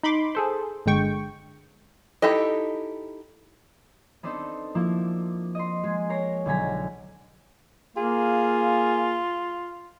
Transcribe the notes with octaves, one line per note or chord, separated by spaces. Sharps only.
D#4 B5 C6 D6
G#4 A4 C5
G1 D3 G#3 G5 C#6
D#4 E4 G4 A4 D#5
B3 C4 D4 D#4 A4 C5
F3 A#3 E4
D#5 C6
G#3 G#4
A#4 C#5 A#6 C7
B1 D3 F#3 G#5 A#5 B6
A#3 F4 G#4